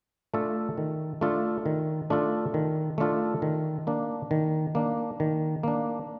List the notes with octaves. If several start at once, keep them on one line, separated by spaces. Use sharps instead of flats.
A3 D4 F4 A4
D#3
A3 D4 F4 A4
D#3
A3 D4 F4 A4
D#3
A3 D4 F4 A4
D#3
A#3 D4
D#3
A#3 D4
D#3
A#3 D4